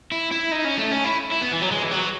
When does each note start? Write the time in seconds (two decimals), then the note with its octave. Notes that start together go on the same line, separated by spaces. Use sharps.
0.12 E4
0.32 E4
0.52 D#4
0.65 C#4
0.78 A3
0.91 C#4
1.04 E4
1.31 E4
1.41 B3
1.52 E3
1.61 F#3
1.71 G#3
1.83 E3
1.91 F#3